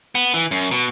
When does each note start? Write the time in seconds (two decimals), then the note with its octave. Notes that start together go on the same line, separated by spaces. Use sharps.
0.15 B3
0.34 E3
0.51 F#2
0.71 B2